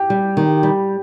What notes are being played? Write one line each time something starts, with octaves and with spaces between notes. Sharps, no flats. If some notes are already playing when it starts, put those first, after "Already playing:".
Already playing: G4
G3
D#3
G3